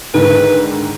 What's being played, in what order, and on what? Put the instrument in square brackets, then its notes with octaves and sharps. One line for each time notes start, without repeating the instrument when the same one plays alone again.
[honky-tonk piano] G#2 D3 D#3 [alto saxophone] B4